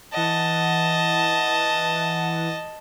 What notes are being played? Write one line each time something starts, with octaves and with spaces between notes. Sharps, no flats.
E3 D#5 F#5 A5